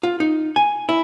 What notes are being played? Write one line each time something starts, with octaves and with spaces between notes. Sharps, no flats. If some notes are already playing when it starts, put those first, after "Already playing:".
F4
D#4
G#5
E4